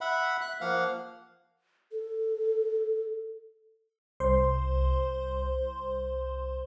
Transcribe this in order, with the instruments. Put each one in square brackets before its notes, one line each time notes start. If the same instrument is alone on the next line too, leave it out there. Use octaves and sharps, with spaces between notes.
[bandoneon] E5 F#5 B5
F#6
F3 A#3 F5 F#5
[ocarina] A4
[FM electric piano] C2 C5 C6